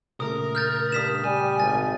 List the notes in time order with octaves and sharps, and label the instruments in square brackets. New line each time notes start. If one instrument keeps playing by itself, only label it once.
[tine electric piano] A#2 C#3 A3 [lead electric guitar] A#4 [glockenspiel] D#6
[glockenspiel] F6 G6 A6
[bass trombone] G2 [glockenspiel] D#6 B6 E7
[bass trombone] G3 [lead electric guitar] G#5
[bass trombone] G#1 [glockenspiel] A6